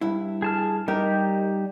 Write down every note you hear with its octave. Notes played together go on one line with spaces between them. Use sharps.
G2 E4
G#4 A5 F6
G3 D#4 G4 A#4